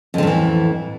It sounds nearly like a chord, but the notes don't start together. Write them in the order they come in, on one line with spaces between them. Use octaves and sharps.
F2 D3 A2 E3